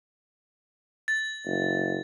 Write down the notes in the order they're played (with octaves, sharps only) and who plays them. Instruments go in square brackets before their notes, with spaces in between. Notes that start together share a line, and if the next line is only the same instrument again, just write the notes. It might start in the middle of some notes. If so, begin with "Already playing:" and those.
[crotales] A6
[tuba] F#1